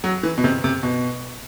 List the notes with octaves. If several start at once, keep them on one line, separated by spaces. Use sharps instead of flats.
F#3
E3
B2
C3
C3
B2